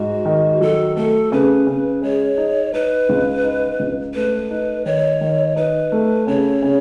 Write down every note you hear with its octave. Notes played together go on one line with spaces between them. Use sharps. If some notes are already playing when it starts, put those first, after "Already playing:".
Already playing: G#2 F#4
D#3
F#3 A4
A3 A4
C#3 B4
C#3
G#3 C#5
D#4
D#4 B4
C#2
D#4
C#2
A3 B4
D#4
D#3 C#5
D#3
D#4 B4
A3
C#3 C#5
C#3